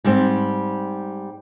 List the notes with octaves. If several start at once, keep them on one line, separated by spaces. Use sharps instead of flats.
G#2 G3 C4